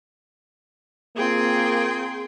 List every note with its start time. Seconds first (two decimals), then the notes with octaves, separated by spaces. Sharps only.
1.16 A#3 C4 F4 G#4 G5 C6